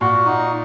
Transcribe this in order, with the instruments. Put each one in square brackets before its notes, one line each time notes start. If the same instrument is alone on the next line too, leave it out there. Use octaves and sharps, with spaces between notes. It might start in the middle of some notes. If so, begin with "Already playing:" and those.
[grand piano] A#2 [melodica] F#4
[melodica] D#4